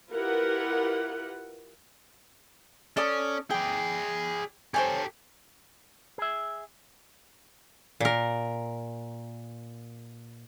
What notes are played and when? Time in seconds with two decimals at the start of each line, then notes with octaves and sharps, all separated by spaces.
0.13 E4 F4 G4 A#4 B4 F#5
2.97 C#4 A4 D5 D#6
3.50 G#4 D5 G5
4.74 G4 A4 C5 C#5 G#5
6.18 G#4 E5
8.00 A#2 A#4